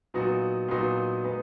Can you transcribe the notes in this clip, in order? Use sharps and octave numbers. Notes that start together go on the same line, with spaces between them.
A#2 F#3 B3 D#4 F#4
A#2 F#3 B3 D#4 F#4
G#3 B3 D#4